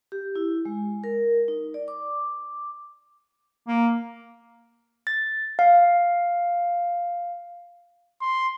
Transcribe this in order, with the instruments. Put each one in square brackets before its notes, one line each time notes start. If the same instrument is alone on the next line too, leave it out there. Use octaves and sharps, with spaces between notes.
[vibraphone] G4
E4
G#3
A#4
D#4
D5
D6
[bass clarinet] A#3
[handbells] A6
F5
[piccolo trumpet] C6